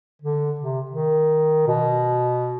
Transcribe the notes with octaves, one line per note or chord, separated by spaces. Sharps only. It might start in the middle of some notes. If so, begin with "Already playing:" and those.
D3
C3
D#3
B2